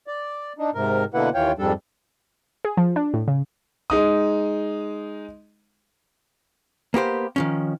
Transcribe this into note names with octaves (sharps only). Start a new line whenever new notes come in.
D5
D4 D#4
G#2 C3 A#4
B2 D3 A#3 E4 B4 F#5
D#2 E3 F4 C#5 G5
F2 G#2 G3 D4 A4
G#4
F3
D4
A2
C#3
G#3 D#4 D#6
A#3 B3 G4 C5
D#3 F3 C#4